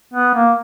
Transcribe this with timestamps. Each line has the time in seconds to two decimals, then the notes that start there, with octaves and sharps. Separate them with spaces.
0.14 B3
0.35 A#3